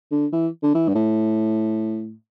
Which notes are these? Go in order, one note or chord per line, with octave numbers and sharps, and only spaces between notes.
D3
E3
D3
E3
G2
A2